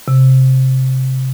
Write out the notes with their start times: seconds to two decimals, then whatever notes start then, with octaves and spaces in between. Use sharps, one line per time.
0.08 C3